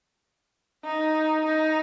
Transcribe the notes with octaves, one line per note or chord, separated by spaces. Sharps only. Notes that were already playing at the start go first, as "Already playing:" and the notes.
D#4
D#4